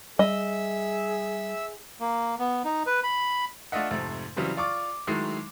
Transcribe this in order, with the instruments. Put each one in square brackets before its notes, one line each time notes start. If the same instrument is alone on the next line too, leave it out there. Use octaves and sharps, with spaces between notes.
[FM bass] G3 [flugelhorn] G#4 [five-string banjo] D#5 [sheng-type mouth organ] E5 E6
[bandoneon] A#3
B3
D#4
B4
B5
[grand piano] A3 D4 F4 D#5 E5 F#5
F2 G#2 C3 A3
C#3 E3 F#3 G3 C4
F4 D5 C#6 D6
D#3 F#3 G#3 A3 E4